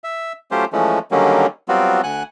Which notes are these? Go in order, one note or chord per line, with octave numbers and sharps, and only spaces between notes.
E5
F#3 A3 C#4 F4 G4 C5
E3 F3 G#3 A3 C#4
D3 D#3 F#3 G3 A#3 C#4
F#3 G3 B3 C4 F4 F#4
D2 F#5 G#5 F#6